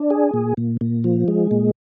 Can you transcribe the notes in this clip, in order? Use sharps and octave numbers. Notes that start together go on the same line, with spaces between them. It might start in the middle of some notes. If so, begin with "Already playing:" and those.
Already playing: D4
G#4
A#2
A#2
A#2
F3
G#3
A#2